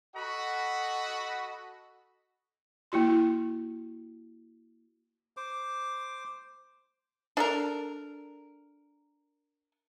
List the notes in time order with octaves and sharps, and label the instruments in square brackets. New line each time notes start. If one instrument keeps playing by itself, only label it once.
[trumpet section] F#4 A4 D#5 F#5 B5
[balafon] A#3 E4 F#4 C6
[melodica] C5 D6
[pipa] D4 A4 A#4